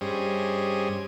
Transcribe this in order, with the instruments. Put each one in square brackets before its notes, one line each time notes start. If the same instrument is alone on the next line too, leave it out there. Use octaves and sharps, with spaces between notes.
[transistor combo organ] G2 G3 C#4 G#4 C5 D#5